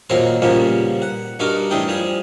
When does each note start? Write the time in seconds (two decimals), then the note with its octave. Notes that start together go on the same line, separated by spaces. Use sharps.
0.10 D#2 A#2 F#3 C4 A#5 C6
0.42 A#2 C#3 F3 G3 A#3 B3
1.02 F#5
1.39 G2 D#4 F#4 A#4 D6
1.70 A2 E3 D4 D#5 G5
1.87 F3 G3 G#4